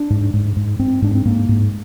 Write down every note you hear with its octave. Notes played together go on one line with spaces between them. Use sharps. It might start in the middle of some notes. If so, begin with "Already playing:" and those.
Already playing: D4
G#2
G#2
G#2
G#2 C4
G#2 D4
C4
G#2 A#3
G#2